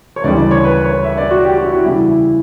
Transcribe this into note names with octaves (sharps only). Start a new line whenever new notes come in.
C#5
D2 C#3 E3 G3 D5
D5
C#5
B4
C#5
E5
D5
F#4
G4
F#4
E4
F#4
E2 C#3 E3 G3 E4
E4